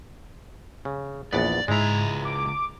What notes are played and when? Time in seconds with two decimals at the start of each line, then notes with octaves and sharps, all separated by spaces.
0.85 C#3
1.33 A#1 E2 B3 D5
1.68 C#2 G#2 G#3 E4 A#5
2.25 D6